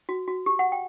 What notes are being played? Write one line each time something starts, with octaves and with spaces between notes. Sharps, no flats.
F#4
F#4
G4
F#5
G5